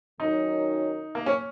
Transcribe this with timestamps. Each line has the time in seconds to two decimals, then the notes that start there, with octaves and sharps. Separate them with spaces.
0.18 F#2 D#3 F#3 C#4 D#4 A#4
1.15 A#3
1.26 C#4